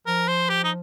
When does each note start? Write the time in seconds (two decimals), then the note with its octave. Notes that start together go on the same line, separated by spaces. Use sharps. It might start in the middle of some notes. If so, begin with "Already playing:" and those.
0.07 F3 A#4
0.28 C5
0.49 G4
0.64 D#4